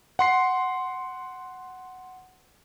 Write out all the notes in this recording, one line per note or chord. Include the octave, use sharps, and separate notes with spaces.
F#5 C6 C7